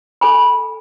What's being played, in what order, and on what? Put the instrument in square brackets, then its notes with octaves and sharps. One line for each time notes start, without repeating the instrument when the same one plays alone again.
[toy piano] A4 G#5 B5